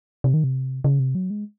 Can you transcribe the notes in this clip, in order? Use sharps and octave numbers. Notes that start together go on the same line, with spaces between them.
C3
D#3
C3
C#3
C3
F#3
G#3